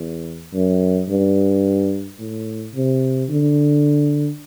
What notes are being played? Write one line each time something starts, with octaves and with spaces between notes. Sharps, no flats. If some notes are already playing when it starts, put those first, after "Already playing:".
Already playing: E2
F#2
G2
A2
C3
D3